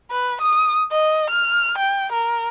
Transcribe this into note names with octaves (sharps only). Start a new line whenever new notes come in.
B4
D#6
D#5
F6
G5
A#4